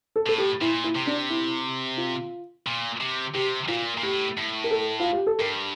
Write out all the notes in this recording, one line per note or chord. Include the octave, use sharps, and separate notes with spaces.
A4
A2 A4
G4
A#2 E4
E4
C3
D4
E4
F4
A#2
C3
C3 G4
A#2 F4
A#2
A2 G4
A2
A#4
A4
F4
G4
A4
G2 A#4